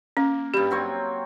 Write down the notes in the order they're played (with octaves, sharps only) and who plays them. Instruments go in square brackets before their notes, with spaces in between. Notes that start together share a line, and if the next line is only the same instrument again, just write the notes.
[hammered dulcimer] A#3 [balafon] C#4
[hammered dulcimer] G2 G3 [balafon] G4
[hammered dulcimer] F#3 C4 C#5